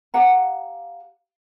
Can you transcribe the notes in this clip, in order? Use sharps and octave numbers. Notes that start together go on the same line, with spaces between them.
G4 F5 F#5 A#5